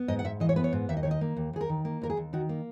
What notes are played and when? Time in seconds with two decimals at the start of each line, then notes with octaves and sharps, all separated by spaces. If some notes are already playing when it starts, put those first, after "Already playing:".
Already playing: B3
0.08 G#2 D#5
0.19 F#5
0.24 G#2 E5
0.40 E3 D#5
0.49 C#5
0.56 B3 B4
0.64 C#5
0.73 G#2
0.89 D#2 E5
0.97 D#5
1.03 D#3 C#5
1.11 D#5
1.21 A#3
1.37 D#2
1.53 D#2 G#4
1.61 A#4
1.69 D#3
1.85 A#3
2.02 D#2 A#4
2.10 G#4
2.17 D#2
2.33 D#3 F#4
2.49 A#3